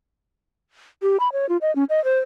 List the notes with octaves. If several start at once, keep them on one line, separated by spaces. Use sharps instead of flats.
G4
B5
C#5
F4
D#5
C#4
D#5
C5